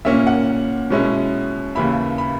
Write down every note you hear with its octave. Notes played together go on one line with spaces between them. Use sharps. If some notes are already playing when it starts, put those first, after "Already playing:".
A#2 A#3 C#4 E5
F#5
B2 G#3 C#4 E4
D#2 C#3 E3 A#3 E4 B5
B5